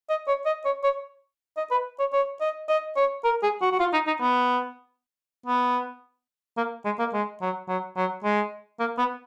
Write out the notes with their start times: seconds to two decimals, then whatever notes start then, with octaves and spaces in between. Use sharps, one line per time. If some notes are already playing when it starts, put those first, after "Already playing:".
0.09 D#5
0.27 C#5
0.46 D#5
0.65 C#5
0.83 C#5
1.57 D#5
1.71 B4
1.99 C#5
2.13 C#5
2.41 D#5
2.69 D#5
2.96 C#5
3.24 A#4
3.43 G#4
3.61 F#4
3.72 F#4
3.79 F4
3.93 D#4
4.07 D#4
4.21 B3
5.46 B3
6.57 A#3
6.85 G#3
6.99 A#3
7.13 G#3
7.41 F#3
7.68 F#3
7.97 F#3
8.24 G#3
8.80 A#3
8.98 B3